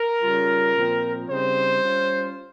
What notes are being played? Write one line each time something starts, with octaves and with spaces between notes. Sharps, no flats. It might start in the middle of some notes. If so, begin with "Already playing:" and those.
Already playing: A#4
C#3 G3 C#4 F4
A#2 F3 C4
C#3 G3 C4 D#4 C5
G3 C#4 F4